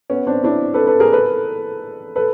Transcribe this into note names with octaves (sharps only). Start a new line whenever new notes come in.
B3 C#4
C4 D4
D4 E4
A4 B4
A4 B4
G#4 A#4
A4 B4
A4 B4